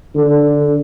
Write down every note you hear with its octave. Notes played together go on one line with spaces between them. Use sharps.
D3